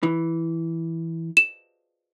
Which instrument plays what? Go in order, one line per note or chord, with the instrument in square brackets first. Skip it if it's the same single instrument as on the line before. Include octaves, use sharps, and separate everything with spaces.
[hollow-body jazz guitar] E3
[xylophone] E7